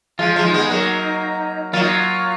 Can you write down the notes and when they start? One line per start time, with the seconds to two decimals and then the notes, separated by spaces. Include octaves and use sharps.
0.19 F3 G#3 F4
0.36 F3 G#3
0.45 D#4
0.53 G#3 B3
0.70 F#3 A#3
1.73 F#3 A#3 F4
1.81 D#4
1.88 F4